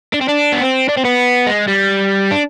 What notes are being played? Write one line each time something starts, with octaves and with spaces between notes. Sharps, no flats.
D4
C4
D4
B3
C4
D4
C4
B3
G#3
G3
D4